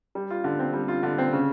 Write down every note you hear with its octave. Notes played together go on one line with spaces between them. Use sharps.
G3
F4
D3
C4
G3
F4
D3
C4
C#3